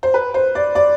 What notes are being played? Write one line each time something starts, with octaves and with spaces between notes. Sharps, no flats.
C5
B4
C5
D5
D5